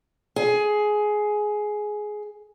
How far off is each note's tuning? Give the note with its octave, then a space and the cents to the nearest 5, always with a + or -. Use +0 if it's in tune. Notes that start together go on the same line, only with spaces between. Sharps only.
G#4 +15